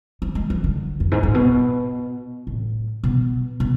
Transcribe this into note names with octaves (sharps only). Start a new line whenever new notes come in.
F3
G#3
F3
D3
F2
G#2
A2
B2
A2
B2
B2